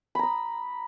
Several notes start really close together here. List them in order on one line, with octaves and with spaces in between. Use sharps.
B5 A#5 D#6